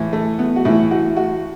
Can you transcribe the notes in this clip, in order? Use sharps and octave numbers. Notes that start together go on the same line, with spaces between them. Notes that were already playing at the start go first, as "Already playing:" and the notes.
Already playing: A2 E3
A3
B3
F#4
A2 E3 E4
F#4
F#4